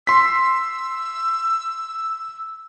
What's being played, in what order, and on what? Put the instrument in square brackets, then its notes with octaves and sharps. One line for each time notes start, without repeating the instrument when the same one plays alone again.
[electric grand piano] C6 B6 [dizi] E6